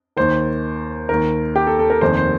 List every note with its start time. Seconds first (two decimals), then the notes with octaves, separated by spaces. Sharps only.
0.17 D#2 D#3 C5
1.09 D#2 D#3 A#4
1.56 G4
1.67 A4
1.79 A4
1.90 A#4
2.01 F1 D#2 D#3 C5
2.17 C5